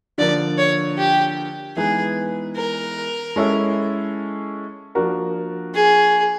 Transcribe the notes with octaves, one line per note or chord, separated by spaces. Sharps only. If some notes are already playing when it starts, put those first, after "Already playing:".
D3 F3 A#3 D5
C#5
G4
E3 G#3 B3 D#4 G#4
A#4
G#3 C#4 E4 A4
F3 A#3 D4 F#4 A#4
G#4